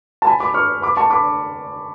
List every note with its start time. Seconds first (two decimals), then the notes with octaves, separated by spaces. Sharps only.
0.22 A5
0.27 G#5 B5
0.40 B5 D6
0.54 C#6 F6
0.82 B5 D6
0.97 A5 C#6
1.10 B5 D6